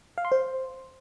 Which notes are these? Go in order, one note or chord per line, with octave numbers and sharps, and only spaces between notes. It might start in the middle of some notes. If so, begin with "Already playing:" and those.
F5
C6
C5